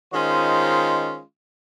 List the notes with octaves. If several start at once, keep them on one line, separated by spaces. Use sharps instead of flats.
D#3 G#3 C#4 F4 C5